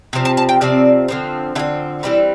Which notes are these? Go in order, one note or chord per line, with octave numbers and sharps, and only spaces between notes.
C3 F3 C4
A5
A5
G5
C3 F3 C4 D5
D3 F3 C4
D3 F3 C4 E4
E3 G3 C4 E4